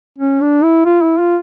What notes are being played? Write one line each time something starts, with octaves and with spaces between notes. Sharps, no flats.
C#4
D4
E4
F4
E4
F4